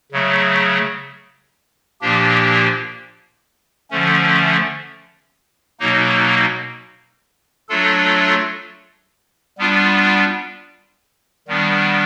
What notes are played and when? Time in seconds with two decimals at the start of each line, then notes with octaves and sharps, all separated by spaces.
0.12 C#3 F#3 A3
2.01 A#2 F3 A#3 D4 G4
3.91 D3 F3 A3 C#4
5.80 B2 F#3 A#3 D#4
7.69 F#3 A3 D4 F4 A4
9.58 G3 B3 D4 F4
11.47 D#3 G3 B3 D4